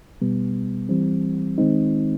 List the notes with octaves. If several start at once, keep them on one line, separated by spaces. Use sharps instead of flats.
B2 G3 B3
E3 G3 C4
D#3 G#3 C4 D#4